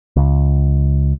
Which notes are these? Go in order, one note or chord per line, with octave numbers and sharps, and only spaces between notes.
C#2